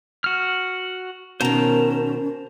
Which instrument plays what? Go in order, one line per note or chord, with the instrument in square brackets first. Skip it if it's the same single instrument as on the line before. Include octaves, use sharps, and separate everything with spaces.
[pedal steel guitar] F#4 F6
[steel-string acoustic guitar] B2 D#3 [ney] C#4 [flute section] A#4 [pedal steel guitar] C5 A5 A#5